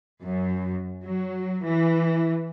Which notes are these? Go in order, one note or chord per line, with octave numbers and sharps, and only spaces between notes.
F#2
F#3
E3